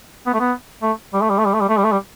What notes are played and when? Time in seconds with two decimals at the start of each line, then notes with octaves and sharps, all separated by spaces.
0.26 B3
0.34 A3
0.40 B3
0.82 A3
1.13 G3
1.22 A3
1.30 G3
1.38 A3
1.45 G3
1.54 A3
1.60 G3
1.69 A3
1.77 G3
1.84 A3
1.92 G3